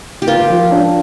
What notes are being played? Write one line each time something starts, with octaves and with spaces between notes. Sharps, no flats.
G4
F4 A#4
F3
D4